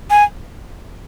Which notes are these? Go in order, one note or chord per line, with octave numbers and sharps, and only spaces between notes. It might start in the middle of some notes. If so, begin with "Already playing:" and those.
G#5